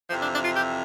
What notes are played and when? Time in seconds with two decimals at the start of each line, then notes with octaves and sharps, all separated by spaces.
0.10 F2 C3 E3 F3
0.21 D4
0.33 D4
0.44 F4
0.55 G4